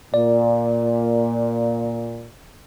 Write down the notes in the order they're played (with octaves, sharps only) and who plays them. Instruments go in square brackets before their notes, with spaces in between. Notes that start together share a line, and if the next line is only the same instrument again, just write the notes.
[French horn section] A#2 [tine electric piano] D5